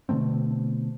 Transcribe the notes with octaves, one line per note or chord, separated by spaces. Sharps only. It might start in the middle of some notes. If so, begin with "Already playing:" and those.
B2 D3 A3 C4